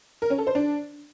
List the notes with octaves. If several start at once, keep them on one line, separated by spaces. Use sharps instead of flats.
A#4
C#4
A4
C5
D4